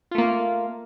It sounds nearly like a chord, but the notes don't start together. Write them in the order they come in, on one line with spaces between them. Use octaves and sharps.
F4 A3 A#3